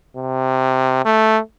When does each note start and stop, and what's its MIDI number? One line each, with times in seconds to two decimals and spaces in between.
0.17 1.01 48
1.05 1.39 57